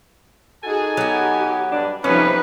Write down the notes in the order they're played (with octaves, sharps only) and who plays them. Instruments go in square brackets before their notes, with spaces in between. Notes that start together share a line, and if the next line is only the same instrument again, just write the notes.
[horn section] D#4 A4 G#5 [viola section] F#4 G#4
[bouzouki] F#3 B3 [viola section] G4
[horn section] G2 D4
[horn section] C3 B3 C#4 [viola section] F3 G3 D#4 [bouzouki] A3 [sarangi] B4